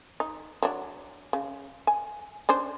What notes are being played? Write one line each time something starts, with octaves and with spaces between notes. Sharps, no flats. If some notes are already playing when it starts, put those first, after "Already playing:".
D#4
F#3 D4
C#3
G#5
C#4 D4 C5